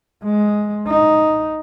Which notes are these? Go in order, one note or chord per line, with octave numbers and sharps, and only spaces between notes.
G#3
D#4